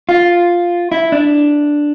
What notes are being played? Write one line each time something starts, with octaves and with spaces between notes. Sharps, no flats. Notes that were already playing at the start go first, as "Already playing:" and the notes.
F4
E4
D4